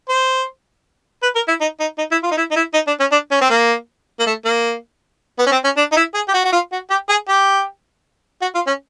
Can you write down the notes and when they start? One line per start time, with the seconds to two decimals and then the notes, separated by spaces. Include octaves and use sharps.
0.09 C5
1.23 B4
1.36 A#4
1.48 E4
1.61 D#4
1.80 D#4
1.98 D#4
2.11 E4
2.23 F4
2.31 D#4
2.37 E4
2.51 D#4
2.56 E4
2.74 D#4
2.87 D4
3.00 C#4
3.12 D4
3.32 C#4
3.41 C4
3.50 A#3
4.19 A#3
4.26 A3
4.45 A#3
5.39 B3
5.46 C#4
5.52 C4
5.64 C#4
5.77 D4
5.92 D#4
5.96 E4
6.14 G#4
6.28 G4
6.34 F#4
6.44 F#4
6.52 F4
6.72 F#4
6.90 G4
7.09 G#4
7.29 G4
8.42 F#4
8.55 F4
8.67 C#4